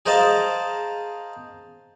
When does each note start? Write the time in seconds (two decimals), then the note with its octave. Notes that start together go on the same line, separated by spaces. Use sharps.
0.06 G#4 A#4 C5 D#5 F5 A5